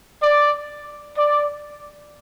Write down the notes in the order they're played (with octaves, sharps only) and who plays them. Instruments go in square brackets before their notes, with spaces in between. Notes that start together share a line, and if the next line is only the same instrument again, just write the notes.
[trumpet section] D5
D5